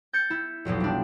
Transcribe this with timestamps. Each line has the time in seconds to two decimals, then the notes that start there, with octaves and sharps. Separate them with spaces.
0.13 G6 A6 C#7
0.30 E4
0.65 F1 B1 F2 B2
0.80 G3 D4